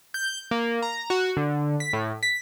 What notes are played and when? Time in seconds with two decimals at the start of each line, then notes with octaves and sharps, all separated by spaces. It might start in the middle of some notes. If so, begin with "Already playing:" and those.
0.14 G6
0.51 A#3
0.82 A#5
1.10 F#4
1.37 D3
1.80 B6
1.93 A2
2.23 B6